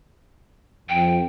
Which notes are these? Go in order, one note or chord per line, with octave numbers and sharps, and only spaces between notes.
F2 G5